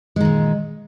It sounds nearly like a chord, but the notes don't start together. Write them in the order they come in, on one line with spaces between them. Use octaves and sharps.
G#3 D#3 A#2